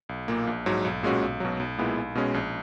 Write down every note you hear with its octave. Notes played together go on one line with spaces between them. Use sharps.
B1
A#2 A#3
A#1
G#2 F#3
B1
A#2 G#3 C#4 F#4
B1
B2 F#3
B1
A#2 G#3 B3 E4
B1
B2 G#3 C#4
A#1